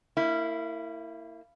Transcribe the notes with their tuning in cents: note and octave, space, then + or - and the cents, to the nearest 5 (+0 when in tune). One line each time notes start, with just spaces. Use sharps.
A#3 -30 E4 +0